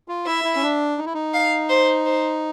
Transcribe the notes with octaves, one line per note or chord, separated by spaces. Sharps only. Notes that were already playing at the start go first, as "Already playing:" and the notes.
F4
E4 E5
E4
C#4
D4
D#4
E4
D#4
F5
C5
C5